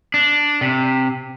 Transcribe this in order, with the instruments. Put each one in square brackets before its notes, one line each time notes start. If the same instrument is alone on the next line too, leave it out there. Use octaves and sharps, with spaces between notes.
[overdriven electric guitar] D4
C3